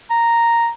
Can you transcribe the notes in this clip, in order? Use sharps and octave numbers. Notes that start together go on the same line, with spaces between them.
A#5